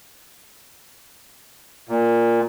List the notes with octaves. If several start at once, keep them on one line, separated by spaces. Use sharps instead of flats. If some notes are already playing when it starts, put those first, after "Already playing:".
A#2